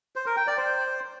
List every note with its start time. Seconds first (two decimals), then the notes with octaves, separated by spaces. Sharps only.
0.16 C5
0.26 A#4
0.37 G5
0.47 D5
0.58 C5